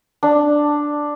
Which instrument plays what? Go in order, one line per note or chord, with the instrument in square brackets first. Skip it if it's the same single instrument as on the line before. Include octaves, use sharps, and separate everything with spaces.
[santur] D4